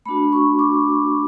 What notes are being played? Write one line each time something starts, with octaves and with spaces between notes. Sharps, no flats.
A3 D4 F#4 B5
C#6
D6